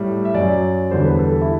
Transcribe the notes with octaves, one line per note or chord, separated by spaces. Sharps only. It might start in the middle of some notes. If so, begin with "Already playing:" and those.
Already playing: A2 G3
E5
F#2 F#3 D5
E2 D3 G3 C5
B4
A4
E4